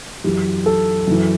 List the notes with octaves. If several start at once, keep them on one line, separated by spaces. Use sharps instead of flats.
F#2 E3 G4
A4
F#2 E3